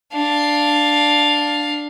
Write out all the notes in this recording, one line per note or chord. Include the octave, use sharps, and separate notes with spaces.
D4 F5